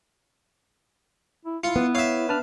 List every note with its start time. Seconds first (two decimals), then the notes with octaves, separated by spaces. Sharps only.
1.45 E4
1.64 E4 F4 C#7
1.76 B3
1.95 C#5 E5 F5
2.29 D4 B4 A5 F6